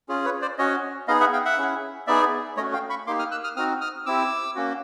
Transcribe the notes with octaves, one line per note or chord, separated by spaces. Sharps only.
C#4 F4 G#4
B4 C#5
C5 D5
C#4 F#4 C#5 D#5
B3 D#4 G#4 D#5 F5
E5 F#5
F5 G5
E5 F#5
C#4 E4 G#4
B3 D#4 G#4 D5 E5
A3 C#4 F#4 C#5 D#5
F5 G5
B5 C#6
A#3 D#4 G4 C6 D6
D#6 F6
E6 F#6
D#6 F6
C4 D#4 F#4 D#6 F6
D#6 F6
C4 E4 G4 D6 E6
A#3 C#4 F#4